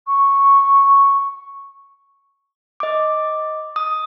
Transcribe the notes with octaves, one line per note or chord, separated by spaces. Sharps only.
C#6
D#5 D6
D#6